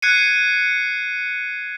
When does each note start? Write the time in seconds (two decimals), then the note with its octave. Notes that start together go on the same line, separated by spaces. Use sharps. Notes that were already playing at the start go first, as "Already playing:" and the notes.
0.02 F#6 G#6 C7 C#7 D#7